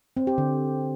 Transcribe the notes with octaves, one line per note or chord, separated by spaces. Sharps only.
C4
G4
D3